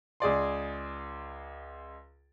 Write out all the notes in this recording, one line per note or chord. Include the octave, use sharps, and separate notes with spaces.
C#2 G#4 D5 C6